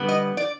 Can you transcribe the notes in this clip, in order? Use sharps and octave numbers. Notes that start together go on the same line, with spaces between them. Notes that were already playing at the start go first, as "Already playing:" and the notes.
Already playing: D3 G3 B3
D#5
D5